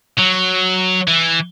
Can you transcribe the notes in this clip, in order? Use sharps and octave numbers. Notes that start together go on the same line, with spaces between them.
F#3
E3